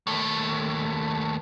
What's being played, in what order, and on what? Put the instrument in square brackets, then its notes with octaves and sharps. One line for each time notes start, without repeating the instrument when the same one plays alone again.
[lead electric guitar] D#2 A3